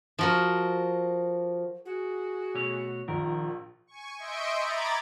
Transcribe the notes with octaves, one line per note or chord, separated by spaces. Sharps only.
F3 F#4 A#4
F#4 G#4
B2 A3 C#5
A#1 D#3 A#4
G#5 C#6
D#5 E5 C6 C#6 G6 D7
A#5 B5 D6 G#6 A6